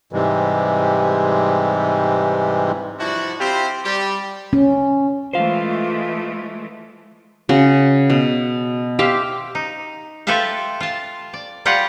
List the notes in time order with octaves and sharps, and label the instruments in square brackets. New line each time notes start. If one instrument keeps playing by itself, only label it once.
[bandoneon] G#2 C3 E3 G3 G#3
[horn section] F3 G3 D4 E4 F#4
C4 E4 F4 G4 C5
G3 G4
[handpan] C#4
[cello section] E3 G#3 A3 [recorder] F4 [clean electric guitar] C5 F5
[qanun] C#3 F#4
B2
G4 C5 E5 F5
[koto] D#4
F4 G4 A4 B4 E5 F5
F4 A5
D5
G3 F4 G4 C#5 F#5